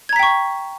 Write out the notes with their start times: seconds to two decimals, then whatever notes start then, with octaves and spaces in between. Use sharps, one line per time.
0.09 G#6
0.13 A#5
0.16 B6
0.19 G5
0.23 C#6